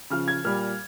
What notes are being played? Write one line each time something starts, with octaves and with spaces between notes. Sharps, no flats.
C#3 F3 F6
G#6
A#2 G3 F6